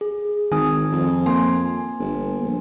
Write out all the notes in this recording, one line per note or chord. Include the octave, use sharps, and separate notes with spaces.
G#4
G#1 D#3 G#5 D#6
F2
A#3 G#5 C6
G1
A#1